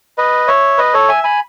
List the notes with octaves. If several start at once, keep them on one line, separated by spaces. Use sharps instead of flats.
B4 D#5
C#5 E5
B4 D#5
A4 C#5
E5 G#5
G#5 B5